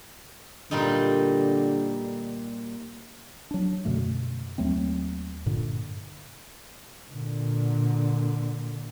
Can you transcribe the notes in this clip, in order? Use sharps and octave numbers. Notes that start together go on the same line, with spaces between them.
A#2 D3 G3 D#4
F#3 D4
F#2 B2 D3 A3
D#2 F#3 A3 C4
G2 A#2 D3
A#2 D3